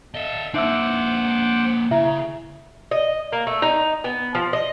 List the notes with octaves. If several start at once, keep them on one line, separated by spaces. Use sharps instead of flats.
A4 D#5 E5
A#3 C4 D#4 C5 E5 F#5 D6 E6
C#3 E4 E5
D#5
A#3
A3
D#4
B3
F3
D#5